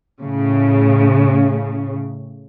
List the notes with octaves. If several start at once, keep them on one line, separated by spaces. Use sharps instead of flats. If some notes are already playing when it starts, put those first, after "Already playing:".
A2 C#3